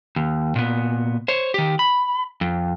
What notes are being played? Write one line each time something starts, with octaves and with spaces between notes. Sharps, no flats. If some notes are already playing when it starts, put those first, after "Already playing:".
D#2
A#2 B3
C5 C#5
D#3 G4
B5
F2